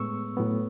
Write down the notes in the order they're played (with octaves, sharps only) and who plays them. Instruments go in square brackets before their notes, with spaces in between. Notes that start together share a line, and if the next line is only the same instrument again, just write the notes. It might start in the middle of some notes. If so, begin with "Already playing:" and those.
Already playing: [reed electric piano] A2 G#3 B3 C#6 E6
A2 F#3 B3